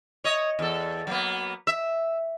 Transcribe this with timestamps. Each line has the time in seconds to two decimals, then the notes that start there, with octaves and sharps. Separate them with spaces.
0.24 C#5 D#5
0.59 E2 A4
1.07 F#3 A#3 B3
1.67 E5